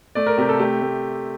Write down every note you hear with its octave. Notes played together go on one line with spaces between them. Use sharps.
A3 D5
A#4
C3 G4
A4
A3 G4
A3